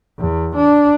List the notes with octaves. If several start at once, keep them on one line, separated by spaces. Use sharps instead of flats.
E2
D4